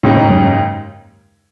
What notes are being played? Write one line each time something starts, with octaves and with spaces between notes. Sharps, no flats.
D#2 A2 C#3 G#3 D#4
G#2
F#2
G#2